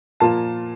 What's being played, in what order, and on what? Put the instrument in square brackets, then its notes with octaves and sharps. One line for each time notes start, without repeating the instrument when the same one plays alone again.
[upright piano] A#2 F3 A#3 F4 A5